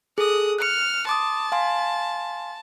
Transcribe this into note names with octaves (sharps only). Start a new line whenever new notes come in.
G#4 A4 D#6 F#6
F6 F#6 C#7
A5 C6 D6 D#6
F5 G#5 C6